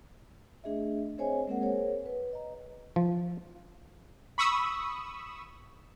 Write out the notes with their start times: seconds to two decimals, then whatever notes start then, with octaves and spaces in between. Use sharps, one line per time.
0.64 A3 D4 G#4 D#5 E5
1.18 C4 G#4 C5 C#5 D#5 G#5
1.47 G#3 A#3 C4 G#4 A#4 F#5
1.61 G#4 A#4 C5 C#5
2.06 B4
2.33 D#5 A#5
2.96 F3
4.38 B5 C#6 D#6 E6